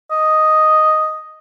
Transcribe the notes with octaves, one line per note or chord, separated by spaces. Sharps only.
D#5